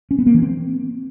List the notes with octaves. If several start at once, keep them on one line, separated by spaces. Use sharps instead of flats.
C#4
B3
A#3
E3
C4